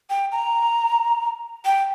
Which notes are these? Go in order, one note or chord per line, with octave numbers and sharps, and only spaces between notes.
G5
A#5
G5